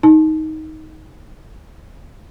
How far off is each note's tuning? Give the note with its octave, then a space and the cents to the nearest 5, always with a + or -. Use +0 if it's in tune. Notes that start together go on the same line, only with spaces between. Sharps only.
D#4 +15 A5 -30